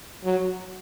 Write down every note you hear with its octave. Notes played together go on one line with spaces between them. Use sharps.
F#3